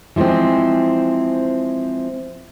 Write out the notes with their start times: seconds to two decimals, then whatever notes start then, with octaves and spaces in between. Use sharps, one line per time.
0.16 E3 F3 G3 G#3 C4